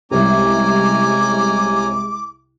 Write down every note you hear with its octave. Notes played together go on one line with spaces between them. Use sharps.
C2 C3 G#3 C#4 G#5 A#5 D6